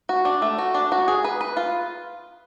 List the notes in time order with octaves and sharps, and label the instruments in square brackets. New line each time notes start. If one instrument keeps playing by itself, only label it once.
[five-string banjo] F#4
D4
A3
F#4
D4
F#4
G#4
B4
B4
F4